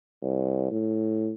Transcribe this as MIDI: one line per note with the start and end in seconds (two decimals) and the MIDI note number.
0.22 0.70 36
0.71 1.33 45